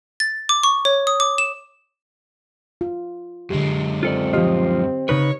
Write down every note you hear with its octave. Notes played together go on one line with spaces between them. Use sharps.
A6
D6
C#6
C#5
D#6
D6
E7
F4
F#2 D3 G#3 G4
C4 F4 A4 D5
F3 F4 G4 D#5
C#3 D#4 B4 C#5